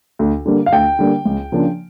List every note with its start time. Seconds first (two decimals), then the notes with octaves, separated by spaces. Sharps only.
0.19 D2
0.46 D3 G3 A#3
0.66 F5
0.72 D2 G5
0.99 D3 G3 A#3
1.25 C#2
1.52 C#3 F3 A#3 D4